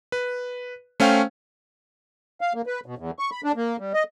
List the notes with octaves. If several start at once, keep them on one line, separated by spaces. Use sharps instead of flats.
B4
A3 C#4 C5 F5 G5
F5
A#3
B4
B2
E2
C#6
B5
D4
A#3
G3
D#5